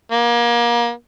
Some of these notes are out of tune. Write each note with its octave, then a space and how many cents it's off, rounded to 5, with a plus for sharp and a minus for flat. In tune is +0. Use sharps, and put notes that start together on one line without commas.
A#3 +30